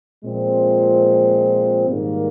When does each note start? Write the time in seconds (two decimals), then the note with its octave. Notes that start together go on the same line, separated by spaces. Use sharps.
0.24 A#2 F3 G#3 C4
1.88 G#2 D#3 G3 A#3